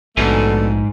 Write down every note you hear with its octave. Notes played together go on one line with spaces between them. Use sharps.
A#1 G#2 B2 D3 A3